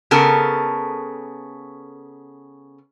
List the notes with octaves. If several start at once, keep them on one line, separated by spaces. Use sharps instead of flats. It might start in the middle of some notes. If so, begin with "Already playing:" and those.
C#3 B3 A4 A#4